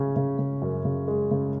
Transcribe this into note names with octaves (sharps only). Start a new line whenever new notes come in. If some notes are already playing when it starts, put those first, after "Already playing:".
Already playing: C#3 C#4
C#3
C#3
F#2
C#3
G#3
C#3